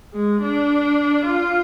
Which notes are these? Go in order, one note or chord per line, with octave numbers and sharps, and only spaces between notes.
G#3
D4
F4